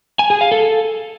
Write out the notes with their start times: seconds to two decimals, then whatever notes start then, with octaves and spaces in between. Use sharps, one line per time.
0.19 G#5
0.30 G#4
0.41 F5
0.52 A4